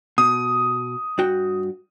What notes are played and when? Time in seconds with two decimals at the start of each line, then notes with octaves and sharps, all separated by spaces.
0.18 B2 D#6
1.18 G2 F#4 G5